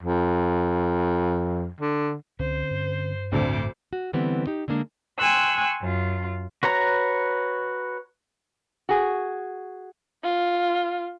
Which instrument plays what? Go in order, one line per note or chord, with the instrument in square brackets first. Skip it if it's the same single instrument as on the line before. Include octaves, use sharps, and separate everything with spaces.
[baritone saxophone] F2
D3
[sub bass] C#2 [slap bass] D3 C4 C#4 [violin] C5
[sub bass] G2
[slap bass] A1 A2 [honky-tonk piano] D2 D3 C4 [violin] C5 D6
[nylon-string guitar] F#4
D3 E3 G3 B3 C4
D#4 G4
D3 G#3 A#3 D4
[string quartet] G5 G#5 C6 C#6 E6 F#6
F#2 F4
[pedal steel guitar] F#4 B4 C#5 A#5
[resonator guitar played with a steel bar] F#4 G#4
[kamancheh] F4